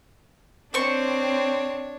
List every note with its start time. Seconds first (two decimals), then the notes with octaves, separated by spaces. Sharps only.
0.74 C4 D4 C5 C#5 C#6